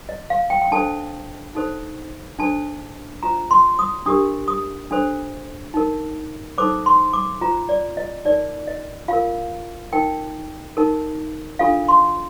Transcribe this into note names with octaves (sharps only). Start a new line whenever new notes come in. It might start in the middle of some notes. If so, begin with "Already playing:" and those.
D#5
F5
G5
G5
D4 A4 C5 A5
D#4 A4 C5
D4 A4 C5 A5
F4 C5 A#5
C6
D#6
D4 G4 A#4 D#6
D#6
D4 A4 C5
D#4 A#4
D#4 A4 C5 D6
C6
D6
F4 C5 A#5
D5
D#5
D#4 A#4 D5
D#5
F4 A#4 F5
D#4 A#4 G5
D#4 A#4
D4 F4 A4 F5
C6